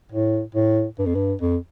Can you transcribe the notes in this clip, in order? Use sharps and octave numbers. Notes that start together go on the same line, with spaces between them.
A2
A2
G2
F2
G2
F2